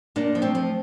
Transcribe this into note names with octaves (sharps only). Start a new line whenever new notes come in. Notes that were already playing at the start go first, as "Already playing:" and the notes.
A#2 A#3 D4
F3
A3 C4
F3